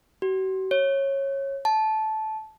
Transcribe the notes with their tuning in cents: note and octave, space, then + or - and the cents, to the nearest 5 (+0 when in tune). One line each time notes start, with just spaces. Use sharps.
F#4 +45
C#5 -15
A5 -15